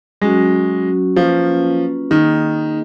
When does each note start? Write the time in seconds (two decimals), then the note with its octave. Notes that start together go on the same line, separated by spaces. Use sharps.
0.21 F#3 G#3 C#4 F#4
1.16 F3 A#3 C#4 F4 B4
2.11 D#3 A#3 D#4 G#4 D#5